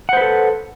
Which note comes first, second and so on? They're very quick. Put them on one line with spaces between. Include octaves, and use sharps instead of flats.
F#5 C5 B4 A4